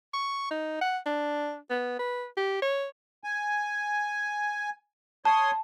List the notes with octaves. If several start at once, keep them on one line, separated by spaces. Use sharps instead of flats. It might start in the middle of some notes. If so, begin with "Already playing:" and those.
C#6
D#4
F#5
D4
B3
B4
G4
C#5
G#5
C#5 A5 C6 D#6